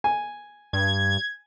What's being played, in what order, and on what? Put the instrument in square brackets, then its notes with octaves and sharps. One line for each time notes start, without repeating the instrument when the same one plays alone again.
[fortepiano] G#5
[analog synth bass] G2 [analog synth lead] G#6